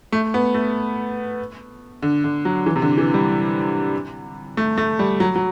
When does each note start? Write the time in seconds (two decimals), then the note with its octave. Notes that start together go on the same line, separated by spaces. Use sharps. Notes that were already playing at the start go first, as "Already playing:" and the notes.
0.12 A3
0.34 B3
0.54 A3
2.02 D3
2.24 D3
2.45 F#3
2.66 E3
2.76 C3
2.82 D3
2.98 E3
3.14 G3
4.57 A3
4.78 A3
4.99 G3
5.20 F#3
5.36 F#3